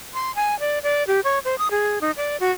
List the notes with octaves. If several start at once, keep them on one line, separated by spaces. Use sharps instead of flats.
C6
G#5
D5
D5
G4
C#5
C5
D#6
G#4
D#4
D5
F#4